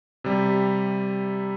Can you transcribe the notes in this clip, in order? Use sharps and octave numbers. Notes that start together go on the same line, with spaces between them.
C3 G3